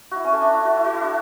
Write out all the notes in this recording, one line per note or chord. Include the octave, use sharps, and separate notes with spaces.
E4 F#4
C#4
A3
D4
E4
F#4
E4
F#4
E4
D4